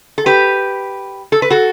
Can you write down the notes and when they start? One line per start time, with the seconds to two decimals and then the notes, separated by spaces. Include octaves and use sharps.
0.18 A4
0.26 G4 B4
1.32 A4
1.42 B4
1.50 F#4 A4